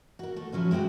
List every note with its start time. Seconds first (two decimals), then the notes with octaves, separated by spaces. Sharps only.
0.19 F#4 A#4
0.36 A3
0.52 F3 F#3 C#4 E4
0.71 G#3 C4 E4 F#4 G4